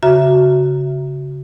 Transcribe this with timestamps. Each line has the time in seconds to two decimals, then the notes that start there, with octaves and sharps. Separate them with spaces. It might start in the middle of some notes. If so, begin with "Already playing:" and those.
0.03 C#3 F#4 E5 A#5